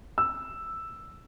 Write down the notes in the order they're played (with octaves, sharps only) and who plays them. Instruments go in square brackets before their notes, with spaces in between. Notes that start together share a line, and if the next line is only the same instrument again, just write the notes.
[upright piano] E6